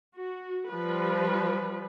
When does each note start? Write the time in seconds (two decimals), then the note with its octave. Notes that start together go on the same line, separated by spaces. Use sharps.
0.16 F#4
0.71 F3 G3 B4